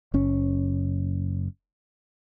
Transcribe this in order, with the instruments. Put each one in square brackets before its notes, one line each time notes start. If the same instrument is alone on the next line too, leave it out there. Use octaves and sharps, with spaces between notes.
[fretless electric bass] F#1 C#4